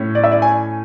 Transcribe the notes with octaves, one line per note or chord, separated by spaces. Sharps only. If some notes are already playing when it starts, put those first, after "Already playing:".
Already playing: A2 C#4
D5
E5
D5
G#5